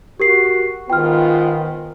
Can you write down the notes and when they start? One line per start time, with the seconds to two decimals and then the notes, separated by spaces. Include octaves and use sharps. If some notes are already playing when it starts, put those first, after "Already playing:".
0.20 F#4 G4 A#4 C7
0.90 G#2 D#3 B3 F4 G5 F6